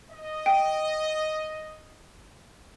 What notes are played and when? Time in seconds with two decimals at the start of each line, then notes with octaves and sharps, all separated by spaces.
0.11 D#5
0.46 G5